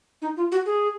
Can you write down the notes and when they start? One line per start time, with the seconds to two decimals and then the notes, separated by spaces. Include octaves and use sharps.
0.22 D#4
0.37 F4
0.52 F#4
0.66 G#4